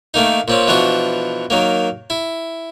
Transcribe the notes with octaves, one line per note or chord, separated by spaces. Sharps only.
D#3 A3 A#3 D#4
A#2 C4 C#4
B2 E3 F3 D4 F#4
D#3 F#3 A#3
E4